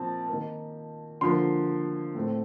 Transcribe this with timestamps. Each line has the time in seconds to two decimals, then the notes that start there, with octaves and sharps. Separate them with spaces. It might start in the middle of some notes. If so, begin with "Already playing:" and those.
Already playing: A#2 F3 C4 A5
0.28 D#3 A#3
1.21 D3 F3 A#3 C6
2.15 A2 A3 C4